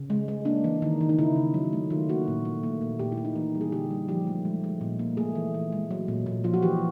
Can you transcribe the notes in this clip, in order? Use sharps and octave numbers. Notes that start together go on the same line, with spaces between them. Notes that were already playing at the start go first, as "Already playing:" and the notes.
Already playing: C#3
G#3
G#3
A#3 D4
E3
D#3 D#4
D#3
D#4
C#3 E4
C#3
F#3
A3
D#3 F4
A#3 F#4
A#2
A3
A#3
A#2
A#2 G4
E4
A#3
D#4
E3
G3
G#4
D3 G4
G3
F3 G4
A3
G#3
G#3
A#2
A#3
A3 G#4
E3
E3
G#3
F#3
A#2
A#2
F3 F4
F#4
E3 G4